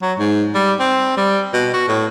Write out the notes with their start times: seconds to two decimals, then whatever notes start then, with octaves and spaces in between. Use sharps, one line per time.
0.02 F#3
0.19 G#2
0.54 G3
0.80 C4
1.17 G3
1.53 B2
1.74 F#4
1.88 A2